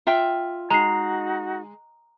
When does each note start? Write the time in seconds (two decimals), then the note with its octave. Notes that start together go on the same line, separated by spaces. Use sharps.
0.07 F4 E5 G5
0.70 G#3 D#4 F#4 A#5 C7